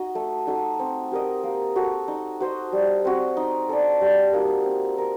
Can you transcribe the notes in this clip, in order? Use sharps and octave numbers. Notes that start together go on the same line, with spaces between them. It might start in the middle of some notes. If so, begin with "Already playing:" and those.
Already playing: D#4 F#4 D#5
A3
D#4 F#4 A4
C4
G4 A#4 D#5
A#3
F#4 A4
D#4
F#4 C5 D#5
G3
C4 F#4
D#4
A4 D5
G3
A#3 D#4 F#4
C4
A#4